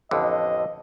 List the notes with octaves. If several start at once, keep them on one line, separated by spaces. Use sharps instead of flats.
A1 F2 D3 D#5